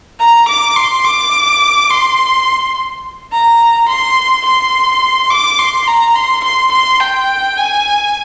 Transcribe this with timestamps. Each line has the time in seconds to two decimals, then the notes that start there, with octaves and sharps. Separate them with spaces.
0.20 A#5
0.48 D6
0.76 C6
1.05 D6
1.90 C6
3.32 A#5
3.88 C6
4.45 C6
5.30 D6
5.59 C6
5.87 A#5
6.16 C6
6.44 C6
6.72 C6
7.00 G5
7.57 G#5